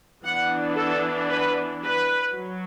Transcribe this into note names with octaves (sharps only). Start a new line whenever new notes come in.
E3 B3 D4 F#5
A4
B4
B4
F#3